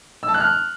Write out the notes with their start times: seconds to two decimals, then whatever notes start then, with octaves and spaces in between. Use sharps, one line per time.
0.23 E6
0.29 A5
0.34 F#6
0.40 F6